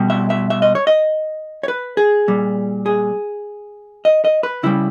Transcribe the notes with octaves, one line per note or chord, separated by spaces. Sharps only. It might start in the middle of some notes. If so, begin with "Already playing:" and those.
Already playing: B2 G3
E5
E5
E5
D#5
C#5
D#5
C#5
B4
G#4
A#2 G3
G#4
D#5
D#5
B4
C#3 G3 E4